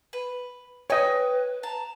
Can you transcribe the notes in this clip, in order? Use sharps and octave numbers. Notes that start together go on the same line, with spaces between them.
B4
B4 C#5 D#5 G5 G#5
A5 A#5